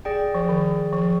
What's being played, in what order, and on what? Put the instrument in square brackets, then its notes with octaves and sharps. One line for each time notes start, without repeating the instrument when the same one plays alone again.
[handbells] G#4 D5 G5
[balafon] F3
D#3
F3